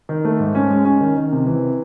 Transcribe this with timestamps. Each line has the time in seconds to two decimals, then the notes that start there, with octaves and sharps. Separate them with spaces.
0.09 D#3
0.25 A3
0.40 G#2
0.55 C#4
0.70 G#3
0.85 C#4
1.01 D#3
1.16 D#3
1.32 C3
1.47 E3